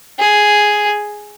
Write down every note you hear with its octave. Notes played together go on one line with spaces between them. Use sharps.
G#4